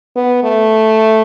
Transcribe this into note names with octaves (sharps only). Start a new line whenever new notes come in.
B3
A3